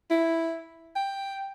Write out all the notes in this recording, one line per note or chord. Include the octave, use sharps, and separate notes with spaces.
E4
G5